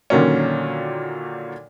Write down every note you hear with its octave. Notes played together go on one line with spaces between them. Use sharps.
A#2 D3 D#3 F#3 A#3 C#4